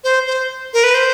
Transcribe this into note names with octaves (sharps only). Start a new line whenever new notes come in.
C5
C5
A#4
B4
C5